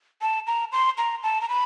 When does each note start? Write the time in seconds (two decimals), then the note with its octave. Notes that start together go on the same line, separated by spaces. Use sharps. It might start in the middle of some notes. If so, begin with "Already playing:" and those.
0.22 A5
0.47 A#5
0.72 C6
0.98 A#5
1.23 A5
1.41 A#5
1.49 B5